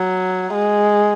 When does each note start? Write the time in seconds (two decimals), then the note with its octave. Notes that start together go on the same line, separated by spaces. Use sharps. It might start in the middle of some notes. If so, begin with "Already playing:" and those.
Already playing: F#3
0.53 G#3